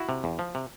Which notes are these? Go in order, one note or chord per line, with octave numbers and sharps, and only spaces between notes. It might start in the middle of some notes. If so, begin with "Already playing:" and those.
Already playing: E4 F#4
C3
E2
F3
C3